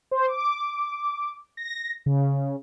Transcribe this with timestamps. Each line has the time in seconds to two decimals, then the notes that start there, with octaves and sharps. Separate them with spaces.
0.11 C5
0.28 D6
1.57 A#6
2.06 C#3